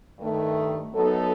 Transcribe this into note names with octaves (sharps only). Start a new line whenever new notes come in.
G2 D#3 A3
F#2 F#3 B3 D#4 A4